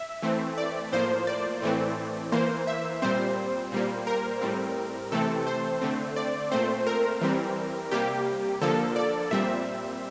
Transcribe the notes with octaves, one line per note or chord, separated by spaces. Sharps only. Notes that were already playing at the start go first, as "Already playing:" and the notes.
Already playing: E5
E3 A3 C4
D5
A2 F3 A#3 C5
D5
A2 E3 A3 C4
E3 A#3 C5
E5
A#2 G3 C4 C5
A#2 G3 A#3
A#4
A2 G3 C4
C3 E3 A3 C4 A4
C5
D3 A3 C4
D5
A#2 A3 C4 C5
A#4
E3 G3 C4
C3 G3 A#3 G4
D3 F3 A#3 A4
D5
A#2 G3 C4 E5